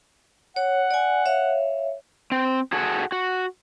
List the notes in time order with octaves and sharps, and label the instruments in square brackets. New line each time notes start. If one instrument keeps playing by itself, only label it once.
[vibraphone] C#5 [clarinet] F#5
[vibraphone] D5 G#5
C#5 E5 F5
[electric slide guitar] C4
F#4 G#4 A4 F#5
F#4